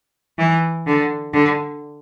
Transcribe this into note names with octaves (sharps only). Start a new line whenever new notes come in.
E3
D3
D3